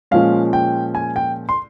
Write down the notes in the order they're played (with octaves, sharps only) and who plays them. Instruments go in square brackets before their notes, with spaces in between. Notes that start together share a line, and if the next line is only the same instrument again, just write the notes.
[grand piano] A#2 F3 G#3 C#4 F5
G5
G#5
G5
C6